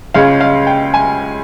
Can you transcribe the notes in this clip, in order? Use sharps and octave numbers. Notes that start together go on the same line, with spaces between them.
C#2 C#3 G#3 C#4 F5
F5
G5
G#5